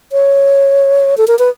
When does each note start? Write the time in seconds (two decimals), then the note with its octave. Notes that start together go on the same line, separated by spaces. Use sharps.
0.12 C#5
1.18 A4
1.27 A#4
1.39 B4